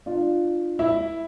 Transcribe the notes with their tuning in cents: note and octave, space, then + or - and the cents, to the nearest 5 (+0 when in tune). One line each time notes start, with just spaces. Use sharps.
D4 +35 F4 +0
E4 +0 E5 +0